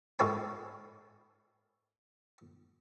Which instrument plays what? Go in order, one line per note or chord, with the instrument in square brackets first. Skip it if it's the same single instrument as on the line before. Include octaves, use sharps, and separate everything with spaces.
[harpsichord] G#2 A4 A#4 C#5 G#5 B5